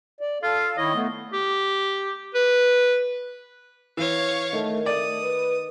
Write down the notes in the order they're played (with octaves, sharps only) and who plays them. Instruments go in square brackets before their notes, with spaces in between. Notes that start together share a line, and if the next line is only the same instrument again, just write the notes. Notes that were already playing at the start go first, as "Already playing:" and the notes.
[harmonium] D5
[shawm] F4 [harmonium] A4 F5
[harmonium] D#3 E4 C#5 [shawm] D#5
[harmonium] A3 B3
[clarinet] G4
B4
[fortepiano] E3 [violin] C#5 F5
[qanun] D#3 [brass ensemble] A3
[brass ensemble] A3 [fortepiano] D5 [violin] D#6
[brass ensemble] B4